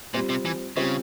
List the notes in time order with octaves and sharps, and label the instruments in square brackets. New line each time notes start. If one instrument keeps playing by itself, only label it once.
[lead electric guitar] A#2 [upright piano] G3 C4 F4 C5
[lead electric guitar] C3
E3
[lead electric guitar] C#3 [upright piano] G3 C4 F4 C5